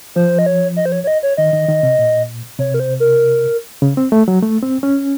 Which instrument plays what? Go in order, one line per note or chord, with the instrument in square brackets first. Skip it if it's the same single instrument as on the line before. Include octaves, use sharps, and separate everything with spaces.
[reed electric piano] F3 [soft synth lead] C5
[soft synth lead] D#5
C#5
D#5
C5
C#5
C#5
D#5
C#5
[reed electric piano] D#3 [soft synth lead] D#5
[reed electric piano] D#3
D#3
C3
A#2
[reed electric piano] C3 [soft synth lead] C#5
[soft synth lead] A#4
C5
A#4
[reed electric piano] C#3
C4
A3
F#3
A3
C4
C#4